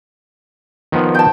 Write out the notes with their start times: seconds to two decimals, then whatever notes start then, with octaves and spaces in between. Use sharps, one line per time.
0.92 D#3 F3 B3
1.15 G5 A5